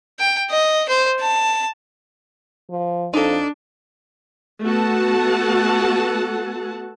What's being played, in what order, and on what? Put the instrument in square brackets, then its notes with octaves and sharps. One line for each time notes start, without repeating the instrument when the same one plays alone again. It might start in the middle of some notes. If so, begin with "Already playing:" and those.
[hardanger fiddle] G5
D#5
C5
A5
[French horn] F3
[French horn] F2 [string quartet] D4 [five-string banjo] D#4 A4
[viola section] A3 B3 F#4 A4 F#5 A5